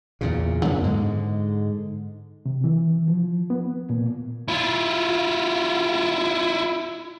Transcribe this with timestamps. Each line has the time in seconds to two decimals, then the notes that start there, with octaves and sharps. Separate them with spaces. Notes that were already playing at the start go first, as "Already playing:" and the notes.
0.21 E2 A#2 C#3
0.64 F#2 C#3 B3
0.83 G#2 D3 G#3
2.46 C3
2.64 E3
3.08 F3
3.50 B3
3.90 A#2
4.48 E4 F4